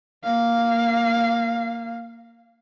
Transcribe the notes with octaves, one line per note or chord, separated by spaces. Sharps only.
A#3 F5